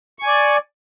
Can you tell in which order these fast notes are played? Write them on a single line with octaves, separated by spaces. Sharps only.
C#6 G#5 D5